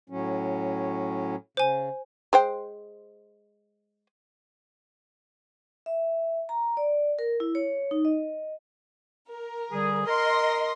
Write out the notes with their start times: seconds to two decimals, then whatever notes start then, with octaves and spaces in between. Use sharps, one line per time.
0.10 A2 F#3 C#4
1.57 C#3 C5 G#5
2.33 G#3 C5 G5
5.86 E5
6.49 A#5
6.77 D5
7.19 A#4
7.40 E4
7.55 C#5
7.91 D#4
8.05 D#5
9.30 A#4
9.71 D3 G3 G#4
10.07 A#4 D#5 C6